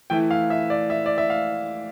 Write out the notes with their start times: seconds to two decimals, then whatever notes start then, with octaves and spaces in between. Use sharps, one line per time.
0.10 E3 A3 E4 G5
0.31 F5
0.50 E5
0.70 D5
0.90 E5
1.06 D5
1.18 E5
1.30 F5